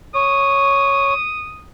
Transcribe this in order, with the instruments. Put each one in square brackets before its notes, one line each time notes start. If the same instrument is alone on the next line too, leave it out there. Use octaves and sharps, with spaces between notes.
[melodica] C#5 [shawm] D#6